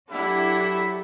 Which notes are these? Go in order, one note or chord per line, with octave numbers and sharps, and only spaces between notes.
F#3 D4 E4 G4 A4 E5 F#5 B5